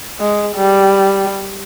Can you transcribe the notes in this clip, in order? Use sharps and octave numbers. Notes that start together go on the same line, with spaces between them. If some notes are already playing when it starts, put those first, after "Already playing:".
G#3
G3